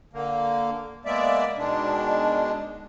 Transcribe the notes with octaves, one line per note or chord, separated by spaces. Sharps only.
D3 A#3
G#3 A#3 B3 D5 E5
B2 D#3 G#3 D4